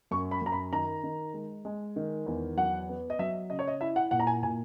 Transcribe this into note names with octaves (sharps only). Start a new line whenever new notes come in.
F#2 C#6
B5
F#2 A#5
B5
D#3 A#5
D#3
G#3
G#3
D#3
E2
F#3 F#5
B3
D#5
F#3 E5
C#3 D#5
C#5
D#5
E4 E5
F#5
A#2 F#5
A#5
G#5
A#2 G#5